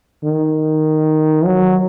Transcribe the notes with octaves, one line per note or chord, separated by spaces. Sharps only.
D#3
F#3